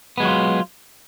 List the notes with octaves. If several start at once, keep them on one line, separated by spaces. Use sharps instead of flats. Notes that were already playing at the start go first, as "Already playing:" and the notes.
F#3 G#3 B3 F4 F#4